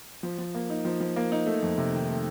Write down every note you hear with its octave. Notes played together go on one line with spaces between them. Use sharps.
F3
F3
A#3
D#4
F3
F3
A#3
D#4
A3
F2
C3
D#3
A3